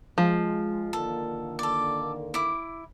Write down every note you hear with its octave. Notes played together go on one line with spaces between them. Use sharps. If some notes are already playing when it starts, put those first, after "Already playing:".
F3 G#3
D3 D#3 A#3 A4
A4 D5
E4 D6